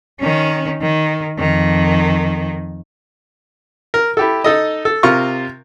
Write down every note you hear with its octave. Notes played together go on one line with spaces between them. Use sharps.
D#3 C#4
D#3
F2 D#3
A#4
E4 G4 A4
D#4 A4 D#5
A4
C3 F4 A#4 C#6